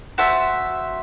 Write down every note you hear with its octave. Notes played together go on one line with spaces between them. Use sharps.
F#4 C5 E5 A5